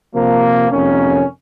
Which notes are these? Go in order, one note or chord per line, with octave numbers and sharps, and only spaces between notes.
C3 F3 A#3
F2 C3 D#3 A#3 C#4